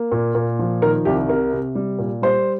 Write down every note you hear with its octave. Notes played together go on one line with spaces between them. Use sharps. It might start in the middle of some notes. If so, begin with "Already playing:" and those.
Already playing: A#3
A#2
A#2
F3
D#3 A#4
C2 G4
C3 A#4
C3
G3
A#2
G3 C5